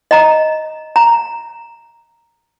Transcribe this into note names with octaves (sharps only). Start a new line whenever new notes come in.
D#5 A#5
A#5